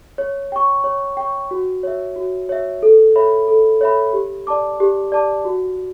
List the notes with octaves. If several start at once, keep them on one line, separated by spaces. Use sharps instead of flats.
C#5
G5 C#6
C#5
G5 C#6
F#4
C#5 E5
F#4
C#5 E5
A4
C#5 E5 B5
A4
C#5 E5 B5
G4
D5 A5 D6
G4
D5 A5 D6
F#4